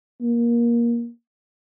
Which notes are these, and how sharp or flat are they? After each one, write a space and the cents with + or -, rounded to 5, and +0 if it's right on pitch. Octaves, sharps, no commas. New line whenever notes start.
A#3 +20